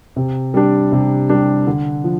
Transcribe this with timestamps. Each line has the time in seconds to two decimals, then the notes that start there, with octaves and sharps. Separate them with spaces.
0.16 C3
0.54 G3 D4
0.92 C3
1.30 G3 D4
1.67 D3
2.04 F3